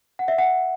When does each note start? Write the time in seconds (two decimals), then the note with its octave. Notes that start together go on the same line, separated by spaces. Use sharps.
0.19 F#5
0.28 E5
0.38 F#5